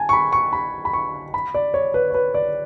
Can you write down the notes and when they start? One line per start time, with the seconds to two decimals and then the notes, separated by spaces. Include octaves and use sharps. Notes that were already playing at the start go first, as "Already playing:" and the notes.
Already playing: G#5 A5
0.09 C#6
0.13 B5
0.33 C#6
0.53 B5
0.85 B5
0.93 C#6
1.34 B5
1.54 D5
1.74 C#5
1.94 B4
2.10 C#5
2.14 B4
2.34 D5